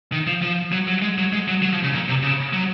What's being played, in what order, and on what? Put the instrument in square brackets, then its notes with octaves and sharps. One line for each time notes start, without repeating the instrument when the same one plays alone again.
[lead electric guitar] D#3
F3
F3
F#3
F#3
G#3
F#3
G#3
F#3
F#3
F3
C#3
A#2
C3
C#3
F#3